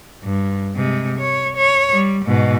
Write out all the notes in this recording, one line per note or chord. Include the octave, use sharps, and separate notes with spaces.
G2
C3 G#3
C#5
C#5
G3
G#2 B2